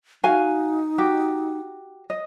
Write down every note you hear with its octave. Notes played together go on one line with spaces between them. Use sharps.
D#4 F#4 F5 G#5
F#4 G4
D#5